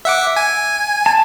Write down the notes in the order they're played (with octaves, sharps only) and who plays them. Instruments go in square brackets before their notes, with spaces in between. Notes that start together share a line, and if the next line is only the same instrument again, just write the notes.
[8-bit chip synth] E5 F#5 D6
G#5
[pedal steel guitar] A5